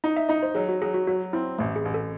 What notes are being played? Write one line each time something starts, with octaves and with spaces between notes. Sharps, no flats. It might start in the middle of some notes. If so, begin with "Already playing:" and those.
D#4
E5
D#4 D#5
C5
F#3 G#4
F#4
F#3 G#4
F#4
F#3 F#4
C4 E4
A1 A3
G#4
A1
A4